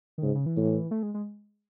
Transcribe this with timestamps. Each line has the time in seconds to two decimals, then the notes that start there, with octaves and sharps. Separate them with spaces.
0.18 D#3
0.23 G#2 C#3
0.35 C#3
0.46 E3
0.57 A2
0.91 A3
1.03 G#3
1.14 G#3